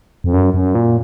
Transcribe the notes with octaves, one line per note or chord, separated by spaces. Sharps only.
F2
F#2
F#2
A#2